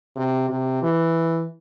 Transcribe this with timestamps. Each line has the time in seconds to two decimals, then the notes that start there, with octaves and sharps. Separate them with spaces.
0.16 C3
0.49 C3
0.83 E3